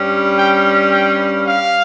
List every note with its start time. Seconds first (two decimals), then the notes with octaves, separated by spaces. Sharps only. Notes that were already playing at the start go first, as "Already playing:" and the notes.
Already playing: G2 G3 C#4
0.37 G5
0.91 G5
1.45 F5